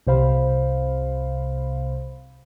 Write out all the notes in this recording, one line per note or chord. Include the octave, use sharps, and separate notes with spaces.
C2 C3 C5 F5 B5